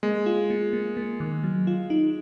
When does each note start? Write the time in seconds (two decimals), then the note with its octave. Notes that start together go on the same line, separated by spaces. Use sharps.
0.03 G#3 A#3
0.26 F4
0.50 A#3
0.73 A#3
0.97 A#3
1.20 D#3
1.44 F#3
1.67 F4
1.90 D#4